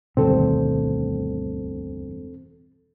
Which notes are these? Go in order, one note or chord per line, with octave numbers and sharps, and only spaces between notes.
E1 D2 G2 B2 D#3 G3 C4 A4